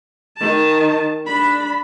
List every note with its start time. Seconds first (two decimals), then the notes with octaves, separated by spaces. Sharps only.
0.37 D#3 A5
1.26 D4 B5